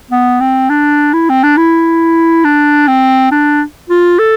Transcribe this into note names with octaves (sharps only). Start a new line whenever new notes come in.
B3
C4
D4
E4
C4
D4
E4
D4
C4
D4
F4
A4